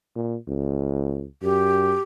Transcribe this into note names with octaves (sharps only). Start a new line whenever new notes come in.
A#2
C#2
F#2 G4